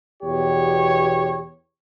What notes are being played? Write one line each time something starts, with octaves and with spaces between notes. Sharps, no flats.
E2 B2 G4 C#5